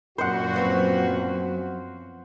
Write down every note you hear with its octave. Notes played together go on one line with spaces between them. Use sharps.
F#2 A#2 F#3 F#4 C5 F#5
F3 B3 C4